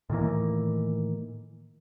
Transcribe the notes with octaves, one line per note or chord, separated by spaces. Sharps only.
A2 D#3 E3 A#3